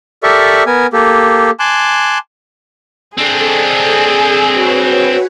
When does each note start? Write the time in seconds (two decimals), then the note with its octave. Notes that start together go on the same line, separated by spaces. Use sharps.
0.23 G4 A4 A#4 D5 E5 C#6
0.66 B3 A#4 G#5
0.93 A#3 G4 A4
1.60 G#5 A5 C6 D6 F#6
3.18 C4 D4 G#4 A4
4.52 F#4 B4 C#5